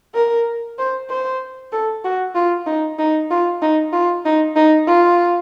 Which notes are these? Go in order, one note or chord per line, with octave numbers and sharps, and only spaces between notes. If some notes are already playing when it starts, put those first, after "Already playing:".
A#4
C5
C5
A4
F#4
F4
D#4
D#4
F4
D#4
F4
D#4
D#4
F4